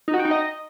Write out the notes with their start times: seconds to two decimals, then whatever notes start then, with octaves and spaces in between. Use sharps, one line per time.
0.08 D#4
0.14 F#4
0.19 G5
0.25 D#4
0.31 D#5